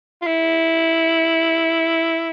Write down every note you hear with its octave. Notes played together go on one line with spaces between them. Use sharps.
F4
E4